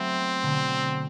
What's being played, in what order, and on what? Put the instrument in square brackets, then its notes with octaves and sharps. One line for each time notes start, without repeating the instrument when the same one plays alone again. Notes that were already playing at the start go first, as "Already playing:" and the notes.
Already playing: [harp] F#3 A3 B3 [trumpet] C4
[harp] B2 D3